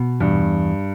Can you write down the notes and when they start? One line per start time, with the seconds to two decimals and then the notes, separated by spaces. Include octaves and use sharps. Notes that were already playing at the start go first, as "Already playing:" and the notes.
Already playing: B2
0.20 E2 G2